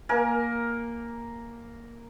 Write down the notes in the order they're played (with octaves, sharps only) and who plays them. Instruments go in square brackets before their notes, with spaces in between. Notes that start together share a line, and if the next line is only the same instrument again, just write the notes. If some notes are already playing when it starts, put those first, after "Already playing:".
[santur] A#3 A#4 G#5